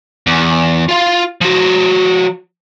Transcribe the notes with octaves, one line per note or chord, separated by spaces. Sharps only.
E2
F4 F5
F3 F#4